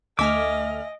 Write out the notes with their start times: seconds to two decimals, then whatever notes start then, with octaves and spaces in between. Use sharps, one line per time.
0.19 D2 A3 D#5 E5 G#5 D6 F6